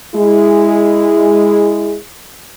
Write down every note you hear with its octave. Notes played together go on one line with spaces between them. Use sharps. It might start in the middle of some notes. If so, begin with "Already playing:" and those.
G#3 E4 G#4